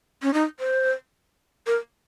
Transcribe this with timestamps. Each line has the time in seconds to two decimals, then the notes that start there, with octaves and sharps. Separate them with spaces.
0.22 C#4
0.34 D#4
0.60 C5
1.67 A#4